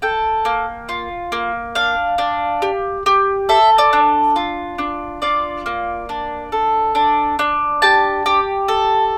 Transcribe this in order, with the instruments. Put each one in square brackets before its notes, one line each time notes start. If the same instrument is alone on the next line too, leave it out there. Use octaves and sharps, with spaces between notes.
[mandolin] A4 G5
A#3
F4
A#3
D4 F5
D4
G4
G4
A4 E5
D5
D4
F4
D4
F4 D5
A#3
D4
A4
D4
D4
G4 A5
G4
A4